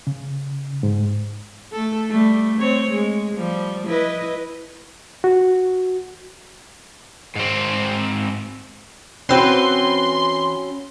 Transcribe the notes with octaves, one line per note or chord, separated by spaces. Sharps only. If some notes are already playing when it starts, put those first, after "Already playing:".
C#3
G#2
A3 A4
G3 A3
C4 C#5
G#3
F3 G3
E4 B4 D#5
F#4
G#2 C4
E3 C4 C#4 F#4 B4 C6